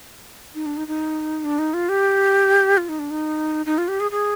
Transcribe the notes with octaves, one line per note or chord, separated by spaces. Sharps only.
D#4
D4
D#4
D#4
D4
D#4
F4
G4
F4
D#4
D4
D#4
D#4
F4
G4
G#4
G#4